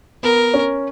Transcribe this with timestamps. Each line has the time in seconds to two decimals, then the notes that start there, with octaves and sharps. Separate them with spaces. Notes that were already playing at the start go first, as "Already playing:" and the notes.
0.23 B3 A#4
0.54 C#4